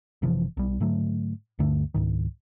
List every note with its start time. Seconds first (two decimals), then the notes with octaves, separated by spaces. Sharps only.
0.22 F#1 C3 E3 F3
0.57 B1 G3
0.80 G#2 D3 F#3 A3
1.59 D2 G2 D3 A3
1.94 C#2 G#2 D#3